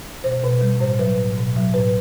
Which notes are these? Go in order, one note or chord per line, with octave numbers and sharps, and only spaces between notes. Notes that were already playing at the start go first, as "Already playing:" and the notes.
B2 C5
B2 B4
G3
A2 C5
F#3 B4
A2
B2
F#3
A2 B4